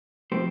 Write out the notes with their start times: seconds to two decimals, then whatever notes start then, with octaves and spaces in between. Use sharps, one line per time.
0.32 F3 A3 C4 G4 C5